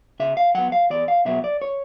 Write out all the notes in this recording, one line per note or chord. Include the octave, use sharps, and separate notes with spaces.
C#3 E5
F5
F#3 B3 F#5
F5
E2 D5
F5
B2 F#3 B3 E5
D5
C#5